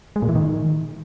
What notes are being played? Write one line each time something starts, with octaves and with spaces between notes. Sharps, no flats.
G#3
A#2
E3
D#3